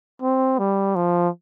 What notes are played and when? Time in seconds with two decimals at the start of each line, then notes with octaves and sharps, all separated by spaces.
0.22 C4
0.59 G3
0.96 F3